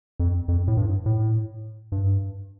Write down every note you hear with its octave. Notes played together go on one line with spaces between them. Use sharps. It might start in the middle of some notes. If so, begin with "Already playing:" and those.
F2
F2
A2
G2
A2
G2